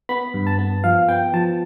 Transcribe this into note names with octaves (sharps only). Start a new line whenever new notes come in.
B3 B5
G2
A5
B3
F3 F5
B3 G5
F3 A5